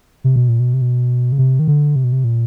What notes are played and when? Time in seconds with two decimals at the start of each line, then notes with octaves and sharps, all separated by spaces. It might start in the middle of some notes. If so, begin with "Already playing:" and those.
0.24 C3
0.36 B2
0.49 A#2
0.60 B2
0.74 C3
0.82 B2
1.32 C#3
1.38 C3
1.59 D#3
1.68 D3
1.96 C3
2.04 B2
2.12 C3
2.24 A#2